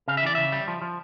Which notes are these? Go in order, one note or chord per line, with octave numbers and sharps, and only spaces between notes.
C#3 F5
E5
E3 D5
C#3 E5
G3
F3
F3